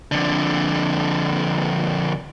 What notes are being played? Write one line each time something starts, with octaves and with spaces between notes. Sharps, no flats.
F2 D3